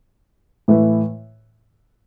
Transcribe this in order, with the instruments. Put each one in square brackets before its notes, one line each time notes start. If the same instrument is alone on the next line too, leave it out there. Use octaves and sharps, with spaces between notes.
[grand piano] A2 E3 A3 E4 B4